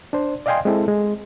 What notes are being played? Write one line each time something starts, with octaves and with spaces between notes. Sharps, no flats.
D4 C5
D5 D#5 F5 G5 G#5 C6
G#3 C4 E4 A4
G#3